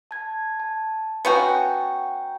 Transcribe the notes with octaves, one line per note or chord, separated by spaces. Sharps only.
A5 G#6
A5
B3 C#4 F#4 G5 A#5 G6